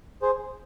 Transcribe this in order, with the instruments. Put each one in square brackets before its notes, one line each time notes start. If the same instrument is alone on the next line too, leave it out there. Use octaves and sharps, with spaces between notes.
[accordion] G#4 C5